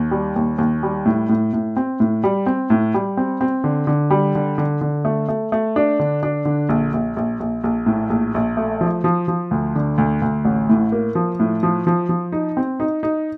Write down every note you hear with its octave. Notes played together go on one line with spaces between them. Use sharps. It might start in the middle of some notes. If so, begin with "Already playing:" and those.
Already playing: D#2
G3
D#2
D#2
G3
A2
A2
A2
C4
A2
G3
C4
A2
G3
C4
C4
D3
D3
G3
D3
D3
D3
A3
A3
A3
D4
D3
D4
D3
A#1
A#1
A#1
A#1
A#1
A2
A#1
A#1
A3
F3
F3
F3
D2
D3
D2
D2
A1
A2
A#3
F3
A2
F3
F3
F3
D#4
C4
D#4
D#4